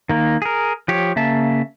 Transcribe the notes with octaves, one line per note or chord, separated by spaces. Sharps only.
D#3 A#3
G#4 A#4
F3 G4 C#5
C#3 A#3 E5 A5